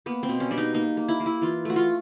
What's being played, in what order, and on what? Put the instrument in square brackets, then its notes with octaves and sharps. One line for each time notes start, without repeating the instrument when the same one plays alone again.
[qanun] A#3 B3
C4
B2
C#4
G3 D4
D#4
A#3 D#4
A#3
E4
A#3
E4
E3 F4
A3 F#4
F4